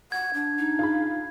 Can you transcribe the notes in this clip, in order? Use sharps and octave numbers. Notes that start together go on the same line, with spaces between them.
F#5 G#6
D4
D#4
F4 G#4 B5